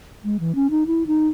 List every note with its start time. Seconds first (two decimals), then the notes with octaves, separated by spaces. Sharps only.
0.24 G#3
0.40 E3
0.55 C#4
0.70 D#4
0.87 E4
1.07 D#4